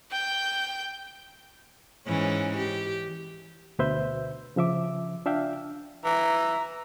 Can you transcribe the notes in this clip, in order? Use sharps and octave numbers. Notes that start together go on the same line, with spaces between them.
G5 G6
G#2 E3 C#4
G4
D2 B2 B4 C5 E5 G6
C#3 F3 E5 D6
D4 F4 E5 F5 G5
E3 A#5